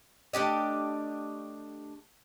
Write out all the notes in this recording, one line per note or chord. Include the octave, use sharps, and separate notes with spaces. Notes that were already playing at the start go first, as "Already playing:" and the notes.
A3 D4 G4 D#5